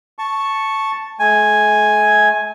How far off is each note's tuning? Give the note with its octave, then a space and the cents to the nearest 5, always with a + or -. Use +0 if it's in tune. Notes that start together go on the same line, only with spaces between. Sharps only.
A5 +0 C#6 -5
A3 -45 G#5 +0